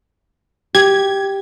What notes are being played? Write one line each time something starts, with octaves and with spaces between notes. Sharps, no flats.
G4 G#6